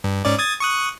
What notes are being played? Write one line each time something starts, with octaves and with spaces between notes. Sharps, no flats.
G2
G#2 C#4 D5
D#6 G#6 A6
C#6 D#6 F#6